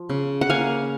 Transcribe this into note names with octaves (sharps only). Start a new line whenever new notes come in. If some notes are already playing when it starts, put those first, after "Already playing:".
Already playing: F3
C#3
F#5
A#3 F5 G#5